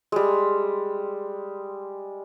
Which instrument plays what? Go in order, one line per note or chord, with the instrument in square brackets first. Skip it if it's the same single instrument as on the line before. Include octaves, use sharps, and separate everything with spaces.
[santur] G3 G#3